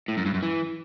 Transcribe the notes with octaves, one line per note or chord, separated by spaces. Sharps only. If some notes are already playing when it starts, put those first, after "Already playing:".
A2
F#2
G2
F#2
E3